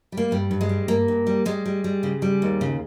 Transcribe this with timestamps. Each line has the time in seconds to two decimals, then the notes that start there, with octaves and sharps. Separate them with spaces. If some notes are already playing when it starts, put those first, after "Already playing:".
0.12 G3
0.17 A#3
0.31 G2 G3
0.51 G2
0.61 G#3
0.69 G3
0.88 G2 A#3
1.08 G2
1.27 G3
1.46 G3 G#3
1.66 G3
1.84 G3
2.03 C#3
2.22 G3
2.42 D#2
2.61 C#3